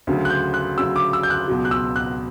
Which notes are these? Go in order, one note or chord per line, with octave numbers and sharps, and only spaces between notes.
D2 C#3 F#3
F#6
G6
F#6
D2 C#3 F#3 E6
D6
E6
G6
F#6
C#2 B2 F#3
F#6
E6
F#6